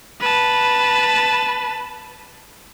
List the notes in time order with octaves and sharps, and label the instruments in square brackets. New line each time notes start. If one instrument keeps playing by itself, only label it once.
[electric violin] B4 A5